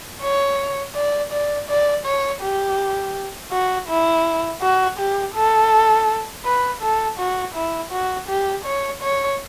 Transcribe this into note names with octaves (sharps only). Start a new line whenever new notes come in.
C#5
D5
D5
D5
C#5
G4
F#4
E4
F#4
G4
A4
B4
A4
F#4
E4
F#4
G4
C#5
C#5